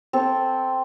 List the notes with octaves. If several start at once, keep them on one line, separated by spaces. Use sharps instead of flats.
C4 A4